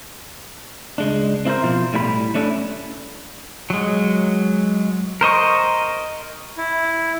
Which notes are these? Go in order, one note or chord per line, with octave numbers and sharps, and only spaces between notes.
C#2 G#3 D4
C4 E4 A4 A#4 C5
B2 F3 F4 C5
A2 G3 E4 G5 B5
A3 C#4 D4 E4 A4
F#3 G#3
A#4 C5 D#5 C#6
E4